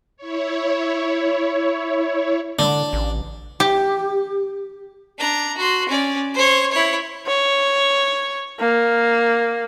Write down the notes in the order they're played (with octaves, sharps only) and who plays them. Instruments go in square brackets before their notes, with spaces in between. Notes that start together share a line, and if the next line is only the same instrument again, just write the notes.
[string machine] E4 C#5
[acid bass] D3 [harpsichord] D4
[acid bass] A1
[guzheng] G4
[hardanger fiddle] D4 A#5
F#4 C6
C#4 D5
C5 C#5
E4 C#5
[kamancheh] C#5
A#3